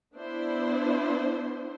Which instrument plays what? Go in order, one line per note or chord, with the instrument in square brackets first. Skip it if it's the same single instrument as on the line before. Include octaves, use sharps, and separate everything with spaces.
[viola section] B3 D4 E4 C5